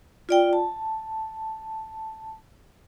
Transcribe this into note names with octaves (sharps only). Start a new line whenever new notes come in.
F4 D5 G5
A5